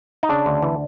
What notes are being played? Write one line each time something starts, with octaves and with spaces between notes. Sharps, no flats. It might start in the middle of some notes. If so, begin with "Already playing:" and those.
D#4
C#3 D4
D2
E3